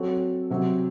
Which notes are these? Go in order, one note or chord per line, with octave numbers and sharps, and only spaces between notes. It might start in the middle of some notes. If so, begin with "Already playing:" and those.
Already playing: F#3 C4 F#4 A4 C#5
C3 F#3 C4